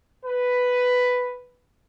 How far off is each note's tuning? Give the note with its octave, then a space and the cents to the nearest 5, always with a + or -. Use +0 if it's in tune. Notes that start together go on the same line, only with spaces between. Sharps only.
B4 +5